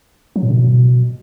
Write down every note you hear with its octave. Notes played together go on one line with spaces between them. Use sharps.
F#3
A2
B2